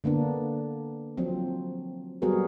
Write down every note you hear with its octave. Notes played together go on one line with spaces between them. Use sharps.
D3 A#3 B3 D4
F3 F#3 C4
F#3 G3 B3 F#4 G#4 A#4